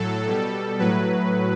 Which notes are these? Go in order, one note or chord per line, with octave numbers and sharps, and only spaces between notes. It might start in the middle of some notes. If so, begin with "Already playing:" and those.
Already playing: A2 F#3 A4
B2 G3
A2 F#3 B4